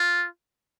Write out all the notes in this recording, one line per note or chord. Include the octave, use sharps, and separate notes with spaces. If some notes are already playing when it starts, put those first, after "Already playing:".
Already playing: F4